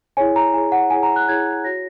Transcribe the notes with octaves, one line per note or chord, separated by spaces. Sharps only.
E4 G#4 C#5 G#5
A#5
E4 G#4 C#5 G#5
F#5
E4 G#4 C#5 G#5
A#5
F#6
E4 G#4 C#5 G#6
F#4 C#5 A#6